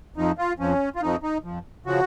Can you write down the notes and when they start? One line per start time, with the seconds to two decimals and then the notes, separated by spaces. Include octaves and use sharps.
0.16 F2 F3 D#4
0.38 F4
0.59 F2 F3 C#4
0.95 F4
1.01 F2 F3 D#4
1.23 D#4
1.44 F2 F3
1.86 C#3 F3 F#4